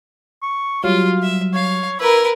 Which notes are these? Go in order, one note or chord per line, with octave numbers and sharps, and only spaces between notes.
C#6
F#3 G3 F4 F5
E5
C#5 F5
E4 A#4 B4